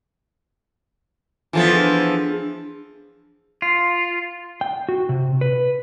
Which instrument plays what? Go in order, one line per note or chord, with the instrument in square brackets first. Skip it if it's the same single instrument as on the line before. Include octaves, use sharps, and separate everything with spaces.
[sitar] E3 F3 B3 [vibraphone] F4 A4 E5
[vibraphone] D4 G#4
[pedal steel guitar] F4
[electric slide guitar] G5
F#4
C3
B4